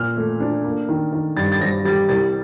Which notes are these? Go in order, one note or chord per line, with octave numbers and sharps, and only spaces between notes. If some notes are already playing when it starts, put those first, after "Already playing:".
Already playing: A#2 F6
A3
D4
A#3
D#3
D#3
G2 A6
A6
G2 A#6
G3 A6
C2 A6